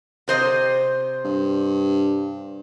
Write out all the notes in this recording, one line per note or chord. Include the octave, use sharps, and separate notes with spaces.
C3 C5 D#5
G2